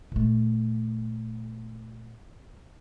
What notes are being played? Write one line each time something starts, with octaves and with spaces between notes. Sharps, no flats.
A#2 A3